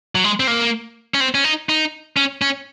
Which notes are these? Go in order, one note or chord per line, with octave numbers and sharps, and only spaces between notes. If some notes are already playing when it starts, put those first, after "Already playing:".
F#3
G#3
C4
A#3
C#4
C4
C#4
D#4
D#4
C#4
C#4